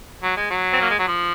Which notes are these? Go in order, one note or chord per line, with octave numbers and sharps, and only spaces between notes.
F#3
G#3
F#3
C4
A#3
G#3
F#3
F3